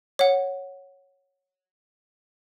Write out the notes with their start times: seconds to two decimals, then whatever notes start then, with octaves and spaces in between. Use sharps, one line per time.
0.19 C#5 F#5